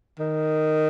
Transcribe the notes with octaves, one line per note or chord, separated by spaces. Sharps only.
D#3